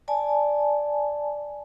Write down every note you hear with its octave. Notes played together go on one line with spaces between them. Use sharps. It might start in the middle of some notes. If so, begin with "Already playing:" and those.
D5 G#5 A5